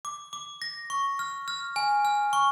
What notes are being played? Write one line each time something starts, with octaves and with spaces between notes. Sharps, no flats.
D6
D6
A#6
C#6
F6
F6
G#5
F6
C#6